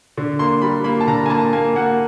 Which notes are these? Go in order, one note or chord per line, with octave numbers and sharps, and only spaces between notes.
D3
A#3 C6
G3 B5
A#3 B5
A5
D3 A#5
G#5
A#3 A5
A#3 G#5
A#3 F#5